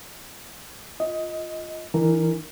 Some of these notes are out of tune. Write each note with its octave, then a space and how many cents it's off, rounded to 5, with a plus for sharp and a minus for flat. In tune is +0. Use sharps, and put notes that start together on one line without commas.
F4 +0 D#5 +15
E3 +0 D#4 -45 A#4 -5